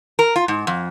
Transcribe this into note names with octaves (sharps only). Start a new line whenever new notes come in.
A#4
F4
G#2
F2